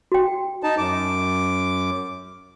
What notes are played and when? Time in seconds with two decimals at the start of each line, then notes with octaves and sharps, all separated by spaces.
0.12 F#4 G5
0.63 D#4 A5
0.78 F#2 D6